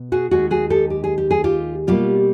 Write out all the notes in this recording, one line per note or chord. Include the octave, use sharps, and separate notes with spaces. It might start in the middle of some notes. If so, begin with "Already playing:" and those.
Already playing: B2
F#4 G#4
D#2 D#3 G#3 F#4 G#4
F#4 G#4
G4 A4
G4
G#4
G4
G#4
F4 G4
B2 G3 A#3 F4 G4